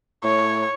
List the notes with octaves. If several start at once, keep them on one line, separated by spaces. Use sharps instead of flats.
A2 C#5